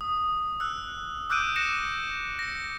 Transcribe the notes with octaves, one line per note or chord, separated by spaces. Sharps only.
D#6
E6 F#6
D6 E6 F#6 G6 D7 D#7
A#6 C#7 E7
A#6 C#7